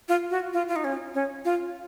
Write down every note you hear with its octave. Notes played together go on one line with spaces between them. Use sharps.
F4
F#4
F4
F4
D#4
C#4
C#4
F4